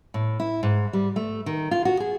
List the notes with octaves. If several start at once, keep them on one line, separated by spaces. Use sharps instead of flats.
A2
E4
G#2
G3
A3
D#3
F4
F#4
G#4